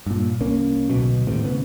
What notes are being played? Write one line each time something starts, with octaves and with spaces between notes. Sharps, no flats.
G2 A#2
C2 A#3 C#4
D1 B1 B2
D#2 A2 C3
C#3 B3